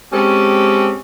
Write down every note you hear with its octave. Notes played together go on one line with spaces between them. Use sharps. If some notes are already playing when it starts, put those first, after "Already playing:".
G#3 C4 C#4 G4 A4